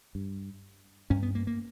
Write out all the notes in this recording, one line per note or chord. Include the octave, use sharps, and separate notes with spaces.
G2
G2 C#4
B3
A#3
A#3